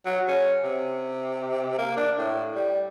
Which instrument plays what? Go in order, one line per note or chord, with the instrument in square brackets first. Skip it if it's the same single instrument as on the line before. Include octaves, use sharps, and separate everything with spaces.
[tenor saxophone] F#3
C#4
C3
A#3
D4
A2
G3